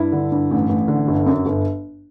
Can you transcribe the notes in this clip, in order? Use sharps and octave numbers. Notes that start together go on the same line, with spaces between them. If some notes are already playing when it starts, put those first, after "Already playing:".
Already playing: G2 E4
D3
G2
A1
A1
D3
G1
F#2
G1